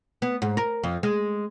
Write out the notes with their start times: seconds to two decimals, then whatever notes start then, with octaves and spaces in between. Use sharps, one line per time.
0.22 B3
0.42 G#2
0.57 A#4
0.84 F2
1.03 G#3